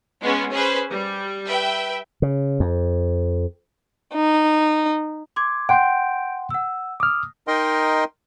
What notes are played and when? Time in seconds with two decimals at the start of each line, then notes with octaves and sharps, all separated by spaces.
0.21 G#3 B3 C#4
0.52 C#4 G#4 B4 C5
0.91 G3
1.47 B4 E5 G5
2.22 C#3
2.60 F2
4.14 D#4
5.36 C6 D6 G#6
5.69 F#5 G5 C6 G6 D7
6.50 F#5 E6
7.00 D6 D#6 F6
7.48 D#4 A#4 D#5 G5 C6